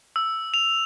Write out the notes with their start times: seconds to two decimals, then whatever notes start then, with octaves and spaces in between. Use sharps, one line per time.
0.16 E6
0.54 F7